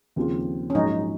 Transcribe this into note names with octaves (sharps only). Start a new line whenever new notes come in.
D#2 C#3 F3 C4 F4
C#4
A#1 G#2 F#3 D#4